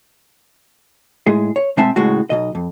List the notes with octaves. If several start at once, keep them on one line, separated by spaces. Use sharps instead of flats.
A2 G#3 G#4
C#5
B2 G#3 C4 E5 A5
C#2 A2 G#3 F#4
B1 B2 D#5
F2